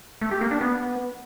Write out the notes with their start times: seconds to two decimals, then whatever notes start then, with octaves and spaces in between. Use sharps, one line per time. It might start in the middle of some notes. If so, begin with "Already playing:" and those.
0.21 A3
0.31 G4
0.41 A#3
0.51 D4
0.61 B3